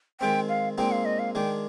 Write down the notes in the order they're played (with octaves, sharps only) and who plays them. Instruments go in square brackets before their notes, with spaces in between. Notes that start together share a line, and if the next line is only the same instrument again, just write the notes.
[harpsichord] D#3 G#3 C4 [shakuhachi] G5
[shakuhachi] F5
[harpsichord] A#2 G#3 C4 D#4 [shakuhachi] G5
[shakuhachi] F5
D#5
F5
[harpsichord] D#3 G#3 D4 [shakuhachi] G5